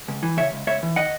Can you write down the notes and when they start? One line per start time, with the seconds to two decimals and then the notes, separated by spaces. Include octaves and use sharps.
0.08 C#2
0.23 E3
0.37 C#3 C#5 E5
0.52 C#2
0.67 C#2 C#5 E5
0.83 E3
0.96 D#3 D#5 F#5